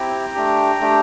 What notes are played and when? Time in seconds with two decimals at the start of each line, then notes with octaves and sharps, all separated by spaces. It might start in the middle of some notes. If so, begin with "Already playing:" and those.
Already playing: C4 E4 G4 G5 A#5
0.34 A3 D4 G4
0.81 A3 D4 G4